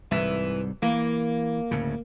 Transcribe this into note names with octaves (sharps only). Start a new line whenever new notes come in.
C2 G#2 C3 E3
E3 A#3
D2 A2 C#3